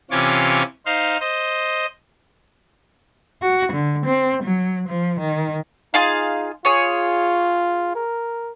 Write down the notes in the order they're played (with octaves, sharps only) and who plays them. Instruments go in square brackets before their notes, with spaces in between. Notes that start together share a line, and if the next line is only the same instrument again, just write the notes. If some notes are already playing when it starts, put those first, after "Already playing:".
[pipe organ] C3 E3 C#4 F4 C#5 D6
D#4 C5 F5
C5 D#5
[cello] F#4
D3
C4
F#3
F3
D#3
[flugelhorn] D#4 [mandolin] F4 G#4 F5
[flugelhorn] F4 [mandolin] G#4 C#5
[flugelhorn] A#4